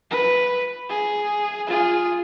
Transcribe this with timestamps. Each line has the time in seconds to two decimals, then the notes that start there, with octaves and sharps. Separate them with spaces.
0.10 B4
0.89 G#4
1.67 F4 G#4